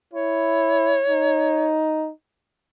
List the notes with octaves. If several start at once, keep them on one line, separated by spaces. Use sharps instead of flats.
E4 C#5
D#4